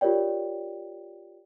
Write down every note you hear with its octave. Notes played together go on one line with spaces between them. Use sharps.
F4 G4 A#4 C#5 D5 G5